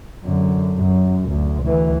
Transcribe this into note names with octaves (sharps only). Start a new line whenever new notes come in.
F#2 D3
F#2
D2
D2 E3